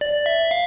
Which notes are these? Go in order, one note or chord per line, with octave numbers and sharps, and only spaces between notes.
D5
E5
F5